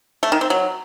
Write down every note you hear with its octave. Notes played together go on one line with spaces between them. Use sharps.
A3
D#3
C4
F#3